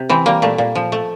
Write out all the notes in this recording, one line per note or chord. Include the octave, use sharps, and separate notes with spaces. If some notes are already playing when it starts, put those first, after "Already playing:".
Already playing: C3
E3 C4
G3 A#3
A#2 A3
A#2
F3
A3